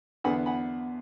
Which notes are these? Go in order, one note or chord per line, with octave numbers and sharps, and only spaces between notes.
E2 D3 B3 F#5 B5
F#5 B5